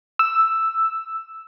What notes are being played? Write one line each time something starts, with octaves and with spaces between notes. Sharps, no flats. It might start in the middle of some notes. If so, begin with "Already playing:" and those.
E6